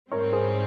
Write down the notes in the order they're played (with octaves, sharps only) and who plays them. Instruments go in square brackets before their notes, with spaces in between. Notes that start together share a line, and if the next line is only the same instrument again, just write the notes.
[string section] G#2 G3 C4 [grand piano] A#4 C#5
[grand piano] G#4 C5